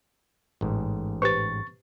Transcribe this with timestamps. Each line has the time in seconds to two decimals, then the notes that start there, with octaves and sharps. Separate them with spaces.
0.61 A1 G#2
1.22 G4 B4 C5 C#6 A6